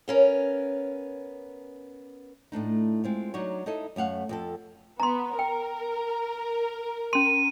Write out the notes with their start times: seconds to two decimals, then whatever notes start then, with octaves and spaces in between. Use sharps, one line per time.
0.08 B3 C#4 A#4
2.52 A2 A3 D4 D#4
3.04 G#3 C4 F4
3.34 F#3 D4 D#4 F#4 C#5
3.66 D#4 E4 A4 D#5
3.96 F#2 A3 F5 F#5
4.29 F2 C4 A4
5.00 B3 A#5 C6
5.39 A#4 G5
7.13 C#4 C6 D#7